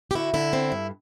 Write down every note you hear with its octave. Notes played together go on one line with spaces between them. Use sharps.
G4
D3 E4 F#4
D3 E4
C4
G2